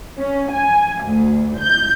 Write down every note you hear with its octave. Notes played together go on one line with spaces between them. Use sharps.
C#4
G#5
D2
G6